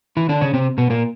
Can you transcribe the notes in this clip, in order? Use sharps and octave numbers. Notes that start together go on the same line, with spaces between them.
E3 E4
D3 D4
C#3 C#4
C3 C4
B2 B3
A#2 A#3